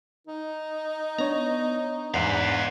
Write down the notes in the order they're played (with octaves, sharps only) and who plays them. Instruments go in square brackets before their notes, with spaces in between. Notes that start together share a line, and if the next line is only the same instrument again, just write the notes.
[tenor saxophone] D#4
[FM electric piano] B3 D4 C#5 [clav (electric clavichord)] A#5
[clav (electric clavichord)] E2 G#2 [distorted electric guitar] B4 F5